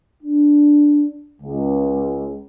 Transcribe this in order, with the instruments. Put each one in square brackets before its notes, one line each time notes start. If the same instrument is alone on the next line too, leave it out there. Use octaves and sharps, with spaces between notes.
[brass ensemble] D4
C#2